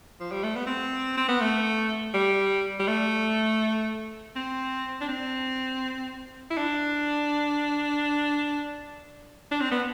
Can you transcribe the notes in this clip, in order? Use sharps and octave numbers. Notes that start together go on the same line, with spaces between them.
F3
G3
A3
B3
C4
C4
B3
A3
G3
G3
A3
C4
D4
C4
E4
D4
D4
C4
B3